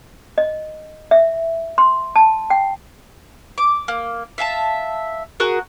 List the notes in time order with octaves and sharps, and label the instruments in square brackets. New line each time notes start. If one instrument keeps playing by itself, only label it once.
[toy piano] D#5
E5
C6
A5
G5
[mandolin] D6
A#3
E5 F5 G#5 A5
F#4 G#4 A#4